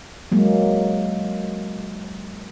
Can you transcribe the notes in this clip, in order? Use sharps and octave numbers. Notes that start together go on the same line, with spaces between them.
F#3 G#3 A#3